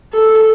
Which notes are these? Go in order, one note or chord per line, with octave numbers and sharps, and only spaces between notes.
A4